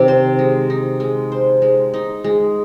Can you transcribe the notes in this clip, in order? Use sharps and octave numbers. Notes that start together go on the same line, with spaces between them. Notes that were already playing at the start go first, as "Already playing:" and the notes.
Already playing: C3 D#3
C5
G#3
D#4
G#3
C5
G#3
D#4
G#3